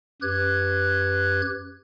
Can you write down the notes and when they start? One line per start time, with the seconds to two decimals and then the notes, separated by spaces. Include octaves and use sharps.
0.22 F#2 G4 B4 F#6 G#6